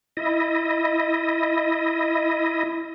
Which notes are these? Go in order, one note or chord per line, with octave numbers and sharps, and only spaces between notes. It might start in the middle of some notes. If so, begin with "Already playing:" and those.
E4 D#5